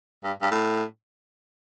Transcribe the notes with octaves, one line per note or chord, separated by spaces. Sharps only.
G2
G2
A2